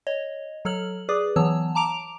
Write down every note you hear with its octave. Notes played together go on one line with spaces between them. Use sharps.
C#5 D#5
F#3 A4 C#5 F6 F#7
G#4 B4 D5 D6 D#6
E3 F#3 B3 C#5 A5 E6
A5 A#5 D6 D7 F7